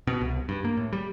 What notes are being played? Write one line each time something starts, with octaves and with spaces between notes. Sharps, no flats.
B2
C2
G2
A#3
A2
G3